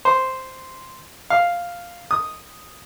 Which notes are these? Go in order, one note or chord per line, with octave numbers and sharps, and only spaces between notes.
C5
F5
D#6